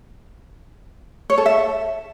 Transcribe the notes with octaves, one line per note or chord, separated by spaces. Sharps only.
C#5
A4
E5